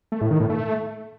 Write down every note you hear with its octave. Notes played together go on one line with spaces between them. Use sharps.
A3
A2
D#3
A2
A3